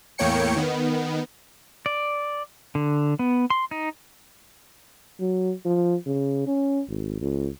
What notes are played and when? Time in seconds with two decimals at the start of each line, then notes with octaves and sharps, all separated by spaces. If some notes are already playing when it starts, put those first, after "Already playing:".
0.18 E2 A2 A#3 C#5 G5 C#7
0.56 D#3 B3
1.86 D5
2.75 D3
3.19 B3
3.50 C6
3.71 D#4
5.20 F#3
5.65 F3
6.06 C#3
6.47 C#4
6.88 G#1
7.21 C#2